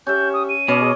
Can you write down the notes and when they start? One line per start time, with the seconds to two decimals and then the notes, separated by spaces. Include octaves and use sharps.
0.07 C#4 G4 E5 G6
0.33 D#6
0.49 D#7
0.68 B2 C#4 D#5 D6
0.80 G#4